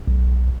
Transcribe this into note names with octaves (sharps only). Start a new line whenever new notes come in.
B1